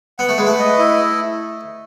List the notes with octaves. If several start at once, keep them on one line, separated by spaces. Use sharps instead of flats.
B3 F#5
A3
G#3 B4
A3
D#5
E4